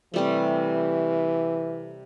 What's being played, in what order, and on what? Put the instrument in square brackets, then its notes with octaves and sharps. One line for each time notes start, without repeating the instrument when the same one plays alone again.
[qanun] C3 G3 A3 [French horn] E3